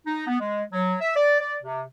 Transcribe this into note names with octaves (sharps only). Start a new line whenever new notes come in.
D#4
B3
G#3
F#3
E5
D5
D5
C3